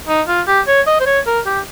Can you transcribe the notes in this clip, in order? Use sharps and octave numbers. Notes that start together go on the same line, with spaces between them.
D#4
F4
G4
C#5
D#5
C5
C#5
A#4
G4